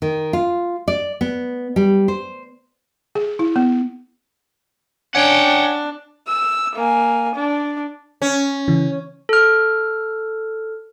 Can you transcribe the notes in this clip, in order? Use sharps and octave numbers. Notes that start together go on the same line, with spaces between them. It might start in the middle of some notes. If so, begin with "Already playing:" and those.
D#3
F4
D5
B3
G3
C5
G#4
E4
B3
C#4 D4 F#5 G5
E6
A#3 G#5
D4
C#4
C#3 E3
A4 F6